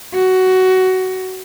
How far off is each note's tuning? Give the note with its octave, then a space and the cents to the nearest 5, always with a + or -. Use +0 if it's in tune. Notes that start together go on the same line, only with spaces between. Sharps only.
F#4 +15